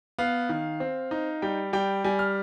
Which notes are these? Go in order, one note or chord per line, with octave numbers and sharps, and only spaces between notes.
B3 F5
D#3
C4
D#4
G3 G5
G3 G5
G3 G#5
F6